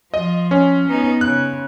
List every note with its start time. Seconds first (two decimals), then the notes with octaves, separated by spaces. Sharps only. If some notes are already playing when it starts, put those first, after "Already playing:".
0.14 F3 D#5
0.51 C#4
0.88 B3 D#4
1.21 C#3 F#6